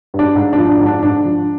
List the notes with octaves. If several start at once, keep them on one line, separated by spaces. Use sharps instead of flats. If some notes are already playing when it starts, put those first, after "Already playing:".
G2
D4
G#2
F3 D4
D4
G#2
D4
G#2 D4
F3